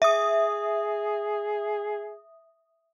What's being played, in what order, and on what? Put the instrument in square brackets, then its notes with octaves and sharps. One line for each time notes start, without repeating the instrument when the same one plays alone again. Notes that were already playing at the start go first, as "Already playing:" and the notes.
[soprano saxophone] G#4 [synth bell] E5 D#6